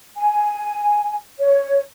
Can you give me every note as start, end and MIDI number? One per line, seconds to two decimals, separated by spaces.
0.17 1.15 80
1.39 1.81 73